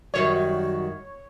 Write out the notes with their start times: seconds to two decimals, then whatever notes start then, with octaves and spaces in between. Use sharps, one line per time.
0.14 F#2 D#3 G3 F#4 C#5